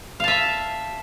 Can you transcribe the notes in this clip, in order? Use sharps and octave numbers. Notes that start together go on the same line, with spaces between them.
E5 F5 A5